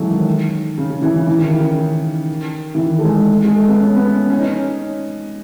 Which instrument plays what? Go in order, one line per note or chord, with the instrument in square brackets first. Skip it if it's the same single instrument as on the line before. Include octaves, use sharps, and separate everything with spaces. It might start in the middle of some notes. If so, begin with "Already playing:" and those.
Already playing: [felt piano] E3 F#3 G#3 A3 C#4
D#3
C#3
C#3
E3
C#3
E3
D#3
C#3
D#3
E3
D#3
A3
G#3
G#3
A3
B3
C#4
B3
C#4
C#4
D#4
C#4